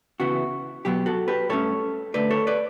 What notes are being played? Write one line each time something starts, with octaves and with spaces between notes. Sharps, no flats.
C#3 E3 B3 E4 F#4
B2 F#3 B3 G4
F#4 A4
G4 B4
G2 D3 A3 C#4 A4 C#5
D2 D3 A3 B4 D5
A4 C#5
B4 D5